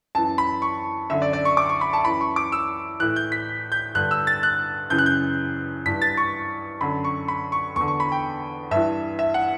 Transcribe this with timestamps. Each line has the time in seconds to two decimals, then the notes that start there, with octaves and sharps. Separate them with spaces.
0.15 F#2 E3 A5
0.38 B5
0.62 C#6
1.10 F#2 D3 E5
1.22 D5
1.33 D5
1.45 C#6
1.57 D6
1.69 C#6
1.81 B5
1.93 A5
2.05 F#2 E3 B5
2.21 C#6
2.36 D6
2.52 E6
3.00 A2 E3 F#6
3.16 G6
3.32 B6
3.72 G6
3.95 G2 D3 F#6
4.11 E6
4.27 A6
4.43 F#6
4.90 F#2 C#3 E3 G6
4.98 F#6
5.06 G6
5.86 G2 E3 B6
6.02 A6
6.17 C#6
6.81 F#2 D3 B5
7.05 C#6
7.28 B5
7.52 C#6
7.76 E2 C#6
7.81 D3
7.88 C#6
8.00 B5
8.12 G5
8.71 G2 E3 E5
9.19 E5
9.34 F#5